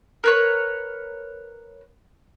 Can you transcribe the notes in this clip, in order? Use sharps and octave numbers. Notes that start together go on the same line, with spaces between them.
A#4 B4 C#5